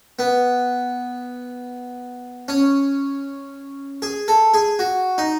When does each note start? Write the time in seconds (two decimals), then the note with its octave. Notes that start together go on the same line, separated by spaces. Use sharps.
0.19 B3
2.48 C#4
4.02 G#4
4.28 A4
4.54 G#4
4.79 F#4
5.18 D#4